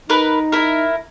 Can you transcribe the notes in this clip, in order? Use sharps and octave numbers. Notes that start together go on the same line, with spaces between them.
D#4 A#4 B4
E4 A#4